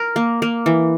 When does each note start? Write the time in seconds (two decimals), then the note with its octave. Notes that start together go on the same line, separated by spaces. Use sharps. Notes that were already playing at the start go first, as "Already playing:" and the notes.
Already playing: A#4
0.16 A#3
0.42 A#3
0.66 E3